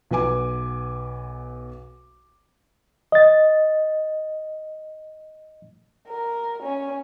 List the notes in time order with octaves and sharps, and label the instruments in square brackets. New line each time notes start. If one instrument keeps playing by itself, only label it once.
[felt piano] B1 B3 B4 G#5 D6
[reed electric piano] D#5 A6
[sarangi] A#4
C#4